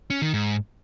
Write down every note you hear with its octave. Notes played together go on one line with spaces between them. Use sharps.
C#4
D#3
G#2